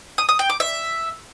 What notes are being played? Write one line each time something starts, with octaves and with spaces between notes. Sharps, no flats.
D#6
D#6
G5
D6
E5